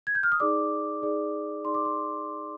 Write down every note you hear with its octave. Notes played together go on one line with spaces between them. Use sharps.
G#6
G6
F6
D#6
D#4 G#4 D5 D6
D#4 G#4 D5
D#4 G#4 D5 C6
D6
C6